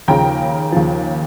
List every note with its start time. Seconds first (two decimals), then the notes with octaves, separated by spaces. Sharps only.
0.08 D#2 C#3 F3 G5 A#5
0.72 D#2 C#3 F3